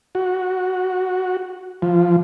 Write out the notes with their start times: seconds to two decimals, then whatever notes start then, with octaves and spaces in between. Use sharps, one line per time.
0.15 F#4
1.82 F3